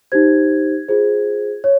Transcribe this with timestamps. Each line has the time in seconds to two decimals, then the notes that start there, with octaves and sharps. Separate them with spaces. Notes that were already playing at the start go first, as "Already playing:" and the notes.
0.12 D#4 G4 C5 G#6
0.88 F4 G#4 C5
1.64 C#5